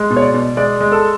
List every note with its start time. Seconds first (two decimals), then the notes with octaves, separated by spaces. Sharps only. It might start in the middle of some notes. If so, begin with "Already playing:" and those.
Already playing: G#3
0.10 B2
0.16 C#5
0.22 D5
0.34 B2
0.57 G#3 D5
0.81 G#3
0.92 A4